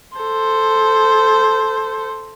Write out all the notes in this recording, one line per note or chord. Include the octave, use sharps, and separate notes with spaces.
A4 C5